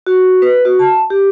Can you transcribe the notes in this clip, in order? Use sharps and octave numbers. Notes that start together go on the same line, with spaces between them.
F#4
B4
F#4
A5
G4